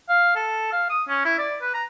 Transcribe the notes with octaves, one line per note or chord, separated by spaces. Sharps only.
F5
A4
F5
D#6
C#4
E4
D5
B4
A#5